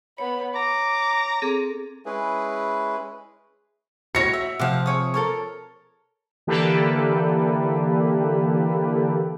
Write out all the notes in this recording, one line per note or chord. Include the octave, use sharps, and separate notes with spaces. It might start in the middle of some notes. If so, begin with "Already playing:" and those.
B3 C#5 B5
A#5 D6
C4 G#4 A4
G#3 C#4 E4 G#4 B4
F#4 C#5 A#6 C#7
E5
C3 F3 F5 F#5
G#4 C#5 D#6
A4 A#4 C#5
D3 E3 A#3 G4 A4 B4